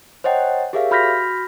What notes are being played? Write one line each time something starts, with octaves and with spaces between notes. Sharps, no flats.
C5 C#5 D#5 F#5 G5 A5
G4 G#4 A#4 C#5 E5 F5
F#4 B5 F6 G6 A#6 B6